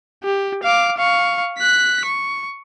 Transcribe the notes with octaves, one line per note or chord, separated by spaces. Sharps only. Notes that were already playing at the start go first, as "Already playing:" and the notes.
G4
F5 D6
F5 C#6
F#6 B6
C#6